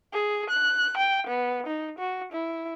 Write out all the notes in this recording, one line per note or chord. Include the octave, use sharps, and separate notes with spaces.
G#4
F#6
G5
B3
D#4
F#4
E4